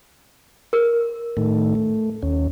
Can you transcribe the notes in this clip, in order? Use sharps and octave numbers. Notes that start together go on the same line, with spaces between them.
A#4
A2 D#3 A3
A3
D#2 C#4